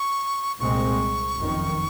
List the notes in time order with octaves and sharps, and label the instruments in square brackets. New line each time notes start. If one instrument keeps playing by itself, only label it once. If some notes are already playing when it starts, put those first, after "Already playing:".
Already playing: [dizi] C#6
[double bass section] C2 A#2 G#3 C4 [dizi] C#6
[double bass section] F#1 F2 D#3